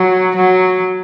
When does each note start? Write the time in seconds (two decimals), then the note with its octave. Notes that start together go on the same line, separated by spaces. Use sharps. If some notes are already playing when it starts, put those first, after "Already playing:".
Already playing: F#3
0.36 F#3